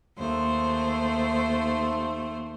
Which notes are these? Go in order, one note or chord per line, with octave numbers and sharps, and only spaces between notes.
D#2 A3 C5